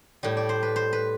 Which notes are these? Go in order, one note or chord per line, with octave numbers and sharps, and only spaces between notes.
A2 G3
D5
C5
B4
C5
B4